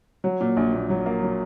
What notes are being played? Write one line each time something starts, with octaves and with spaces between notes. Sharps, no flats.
F#3
A#2
A#1
A#2
F#3
A#3
F#3